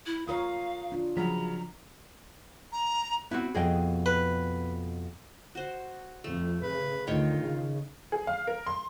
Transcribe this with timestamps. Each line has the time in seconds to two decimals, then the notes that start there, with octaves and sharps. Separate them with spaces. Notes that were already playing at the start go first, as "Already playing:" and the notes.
0.06 E4
0.28 F4 A#4 C#5 F5 A#5 D#6
0.92 D4 F4
1.17 C#3 F3 F#3 A#5 B6
2.72 A#5
3.31 B3 C4 E4 F#4
3.55 F2 B2 G#4 D#5 G5
4.06 B4
5.55 F#4 C5
6.24 F2 A3
6.62 C#3 B4
7.07 D2 D#3 F4 C#5 G5
7.38 C#3
8.12 G#4
8.27 F5
8.47 A#4
8.66 C6